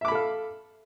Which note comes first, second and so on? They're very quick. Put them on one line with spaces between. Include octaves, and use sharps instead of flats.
E5 D6 B5 A4 F5